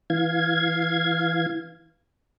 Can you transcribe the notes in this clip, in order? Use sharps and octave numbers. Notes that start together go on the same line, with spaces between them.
E3 F5 G#6